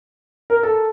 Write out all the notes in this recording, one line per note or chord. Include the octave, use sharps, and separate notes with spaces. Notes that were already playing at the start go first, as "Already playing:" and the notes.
A#4
A4